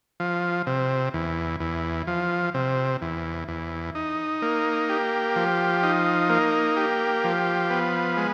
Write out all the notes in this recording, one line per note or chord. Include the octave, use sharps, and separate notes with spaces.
F3
C3
E2
E2
F3
C3
E2
E2
D#4
A#3
G4
F3
D#4
A#3
G4
F3
B3
G#3